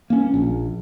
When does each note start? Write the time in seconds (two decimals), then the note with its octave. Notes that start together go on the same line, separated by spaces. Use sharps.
0.10 A#3 C#4
0.34 A#1